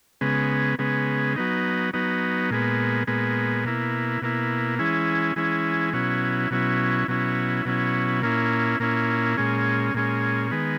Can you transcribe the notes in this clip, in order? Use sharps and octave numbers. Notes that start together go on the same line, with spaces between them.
C#3 G#3 B3
C#3 G#3 B3
F#3 B3 D#4
F#3 B3 D#4
A#2 G#3 B3
A#2 G#3 B3
B2 A#3 E4
B2 A#3 E4
E3 G#3 C#4 E4
E3 G#3 C#4 E4
B2 F#3 C#4 E4
B2 F#3 C#4 E4
B2 F#3 C#4 E4
B2 F#3 C#4 E4
A#2 A#3 C#4 E4
A#2 A#3 C#4 E4
A#2 G#3 C#4
A#2 G#3 C#4
D#3 G#3 B3